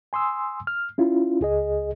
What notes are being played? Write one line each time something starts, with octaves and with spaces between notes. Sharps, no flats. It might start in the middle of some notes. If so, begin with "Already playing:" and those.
G#5 C6 D#6 E6
F6
C#4 E4 F4
C#2 G#4 D#5